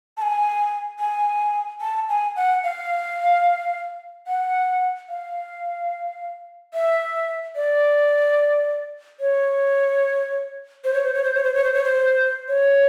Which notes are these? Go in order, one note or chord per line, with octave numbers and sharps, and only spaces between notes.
A5
G#5
G#5
A5
G#5
F#5
F5
F#5
F5
E5
D5
C#5
C5
C#5
C5
C#5
C5
C#5
C5
C#5
C5
C#5
C5
C#5